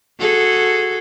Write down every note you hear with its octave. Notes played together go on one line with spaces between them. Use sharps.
F#4 G#4 A4